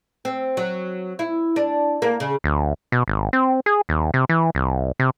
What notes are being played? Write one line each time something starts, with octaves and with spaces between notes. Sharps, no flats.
C4
F#3
E4
D4
A#3
C#3
D2
B2
G#1
C4
G#4
D#2
C3
E3
C2
C3